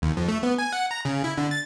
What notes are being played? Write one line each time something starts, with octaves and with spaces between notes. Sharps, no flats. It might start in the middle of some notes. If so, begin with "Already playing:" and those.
D#2
F2
A3
B3
G#5
F#5
A#5
C#3
E4
D3
A6